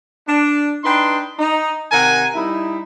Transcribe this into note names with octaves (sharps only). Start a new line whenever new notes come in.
D4
D4 D#4 B4 G5 C6
D#4
C3 D#3 A#4 F#5 G#5
G3 D#4 E4